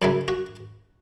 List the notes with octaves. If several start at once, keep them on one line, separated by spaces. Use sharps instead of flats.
F#2 C#3 F#3 E4
F#4